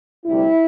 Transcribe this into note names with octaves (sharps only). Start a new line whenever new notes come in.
D2 C3 G3 E4